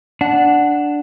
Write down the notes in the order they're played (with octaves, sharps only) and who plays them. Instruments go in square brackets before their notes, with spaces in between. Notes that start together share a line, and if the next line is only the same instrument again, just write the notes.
[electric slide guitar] D4 [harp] F#5